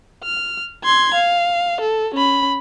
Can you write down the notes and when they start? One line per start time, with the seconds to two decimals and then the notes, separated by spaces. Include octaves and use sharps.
0.23 F6
0.84 C6 G#6
1.15 F5
1.81 A4
2.15 C#4 B5